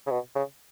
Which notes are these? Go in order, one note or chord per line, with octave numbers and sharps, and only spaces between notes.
C#3
B2
C#3